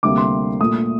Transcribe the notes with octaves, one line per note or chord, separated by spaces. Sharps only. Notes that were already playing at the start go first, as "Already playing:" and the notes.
D2 C3 G3 A#3 D6
C6
A#2 A3 D#6